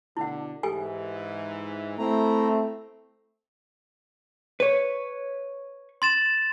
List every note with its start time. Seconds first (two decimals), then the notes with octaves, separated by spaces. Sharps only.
0.17 B2 D3 E4 F#5
0.63 G#2 E3 G4 A4 G#5
1.98 A3 C4 E4 A#5
4.60 B4 C#5
6.02 C6 A6 E7